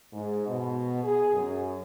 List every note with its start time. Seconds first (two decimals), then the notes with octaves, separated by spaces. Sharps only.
0.12 G#2
0.47 B2
1.03 G#4
1.33 F#2